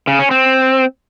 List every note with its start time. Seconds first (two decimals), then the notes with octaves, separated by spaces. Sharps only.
0.07 C#3
0.19 C#4
0.31 C4